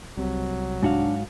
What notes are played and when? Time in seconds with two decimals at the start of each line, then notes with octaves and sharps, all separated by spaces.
0.17 C2 C3 F#3
0.83 G#2 D4 F#4 F5